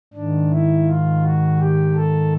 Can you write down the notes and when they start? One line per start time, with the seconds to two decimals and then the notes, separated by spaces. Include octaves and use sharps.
0.14 G#2 D#3 D4
0.50 E4
0.86 F4
1.23 F#4
1.59 G4
1.95 A4